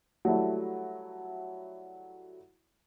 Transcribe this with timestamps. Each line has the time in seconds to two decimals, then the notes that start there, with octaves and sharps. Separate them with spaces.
0.25 F#3 G3 A3 E4